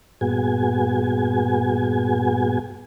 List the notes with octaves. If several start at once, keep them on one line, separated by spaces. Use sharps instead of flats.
G2 A#2 B3 F#4 G#4 G#5